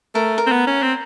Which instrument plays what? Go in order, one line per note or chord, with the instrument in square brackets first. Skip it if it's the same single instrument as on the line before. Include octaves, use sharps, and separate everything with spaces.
[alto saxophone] A3 [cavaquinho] A#4
[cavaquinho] A#4
[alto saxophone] C4
B3
C#4
C4